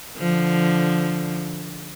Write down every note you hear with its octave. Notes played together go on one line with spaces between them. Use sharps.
D3 F3